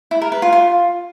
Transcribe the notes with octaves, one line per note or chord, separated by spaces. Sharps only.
E4
A#4
B4
F4
F4